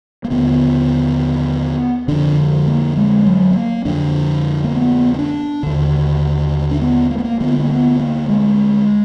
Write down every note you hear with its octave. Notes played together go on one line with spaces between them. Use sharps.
A#3
D#2 D3 B3
F2 D3 D4
A#3
G#3
F#3
B3
A#3
F2 D3 D4
A#3
B3
B3
D4
D#2 D3
D4
B3
A#3
B3
A#3
D2 D3 B3
A#3
B3
A#3
G#3